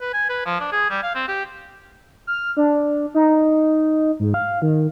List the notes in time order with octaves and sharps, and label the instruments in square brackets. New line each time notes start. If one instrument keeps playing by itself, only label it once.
[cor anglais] B4
G#5
B4
F3
D4
G#4
G3
F5
C4
G4
[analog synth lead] F6
D4
D#4
G#2
F5
D#3